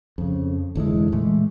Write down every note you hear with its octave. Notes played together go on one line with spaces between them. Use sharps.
F2 C#3
F1 D3 E3 G#3
A#2 E3 G#3 A3